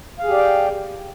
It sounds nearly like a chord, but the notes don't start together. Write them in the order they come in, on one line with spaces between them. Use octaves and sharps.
F5 G#4 G4 D5 G5